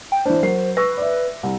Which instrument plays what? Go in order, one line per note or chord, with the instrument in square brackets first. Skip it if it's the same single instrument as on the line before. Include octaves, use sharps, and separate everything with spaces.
[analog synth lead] G5
[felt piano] E3 D4 [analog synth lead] C5
[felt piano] F#3 A#4 C7
[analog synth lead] B4 [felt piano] C#6 E6 A#6
[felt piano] D5 E5
C2